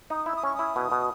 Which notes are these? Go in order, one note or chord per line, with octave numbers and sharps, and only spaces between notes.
D#4 D#6
E4 E6
D#6
C#4 C#6
E4 D#6
B2
B2